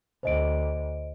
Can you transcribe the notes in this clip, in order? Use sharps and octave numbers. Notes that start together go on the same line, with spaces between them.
D2 C5 D#5 D7